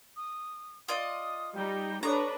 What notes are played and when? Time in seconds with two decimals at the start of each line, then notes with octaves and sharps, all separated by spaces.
0.16 D#6
0.88 F4 D5 D#5 D#6
1.55 G3 D#4 G5
2.03 D4 G4 A4 B4 C#5 A#5 C#6